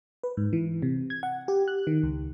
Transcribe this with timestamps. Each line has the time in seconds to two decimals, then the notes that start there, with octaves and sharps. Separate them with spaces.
0.23 B4
0.37 G#2
0.53 E3
0.82 C3
1.10 G#6
1.23 F#5
1.48 G4
1.68 F#6
1.87 D#3
2.03 C#2